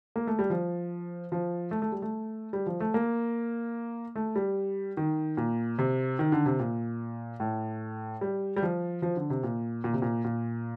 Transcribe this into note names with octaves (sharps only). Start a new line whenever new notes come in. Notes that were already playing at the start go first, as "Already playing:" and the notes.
A#3
A3
G3
F3
F3
A3
A3
G3
A3
G3
F3
A3
A#3
A3
G3
D#3
A#2
C3
D#3
D3
C3
A#2
A2
G3
G3
F3
F3
D3
C3
A#2
A#2
C3
A#2
A#2